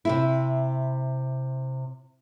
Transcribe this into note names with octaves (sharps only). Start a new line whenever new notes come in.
C3 C4 E4